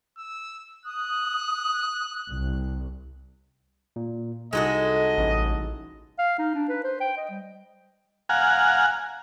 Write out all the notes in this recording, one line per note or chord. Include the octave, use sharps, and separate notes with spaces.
E6
D#6 F#6
C2
A#2
C2 G#3 D#4 F#4 A4 D#5
A1
F5
D#4
D4
B4
C5
G5
D#5
G3
F5 F#5 G#5 A#5